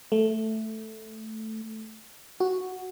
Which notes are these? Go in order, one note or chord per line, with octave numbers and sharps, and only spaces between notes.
A3
F#4